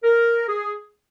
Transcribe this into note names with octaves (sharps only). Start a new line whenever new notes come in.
A#4
G#4